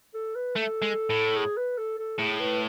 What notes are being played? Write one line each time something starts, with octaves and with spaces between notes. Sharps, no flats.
A4
B4
A3 A4
G#3
A2
G#4
B4
A4
A4
A2 G#4
B4